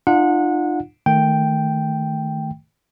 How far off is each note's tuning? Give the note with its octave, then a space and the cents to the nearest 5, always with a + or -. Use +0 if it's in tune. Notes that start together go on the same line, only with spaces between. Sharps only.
D4 +40 F4 -15 F#5 -25
D#3 +0 A3 +0 G5 +0